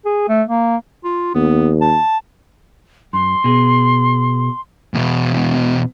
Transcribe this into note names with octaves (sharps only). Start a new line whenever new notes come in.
G#4
A3
A#3
F4
D#2 B3
A5
F#2 C6
B2 G#4
E2 B2